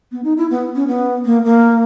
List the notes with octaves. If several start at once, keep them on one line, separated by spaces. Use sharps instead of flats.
B3
D#4
E4
B3
C#4
B3
A#3
A#3